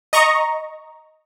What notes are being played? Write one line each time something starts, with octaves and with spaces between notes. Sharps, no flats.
D#5 A#5 C#6